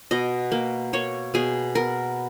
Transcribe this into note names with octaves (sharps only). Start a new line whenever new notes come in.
B2 D#5
A#3
A#3 C#5
B2 G#4
B3 A#4